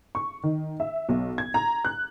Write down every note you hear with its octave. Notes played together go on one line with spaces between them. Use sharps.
C#6
D#3
E5
B1
G#6
A#5
F#6